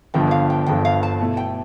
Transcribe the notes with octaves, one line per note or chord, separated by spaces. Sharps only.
G1 G2 D3 F3 G5
F5
G5
G1 G2 D3 F3 G5
F5
A5
B2 A3 E4
G5